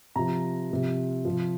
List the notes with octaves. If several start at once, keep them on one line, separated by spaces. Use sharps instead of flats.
C3 F3 A#5
C3 F3
C3 F3